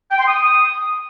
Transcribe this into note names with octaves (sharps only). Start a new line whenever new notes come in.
G5
C6
D#6